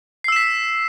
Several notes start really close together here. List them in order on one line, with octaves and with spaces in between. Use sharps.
C7 E6 E7 B6